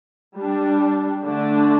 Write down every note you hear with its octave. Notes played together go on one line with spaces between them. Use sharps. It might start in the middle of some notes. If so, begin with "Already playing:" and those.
G3 D4
D3 A3 D4